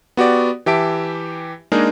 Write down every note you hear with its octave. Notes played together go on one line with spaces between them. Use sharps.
B3 F#4 G4 D5
E3 G4 E5 A5 D7
G#3 A#3 D4 D#4 G#4 A#4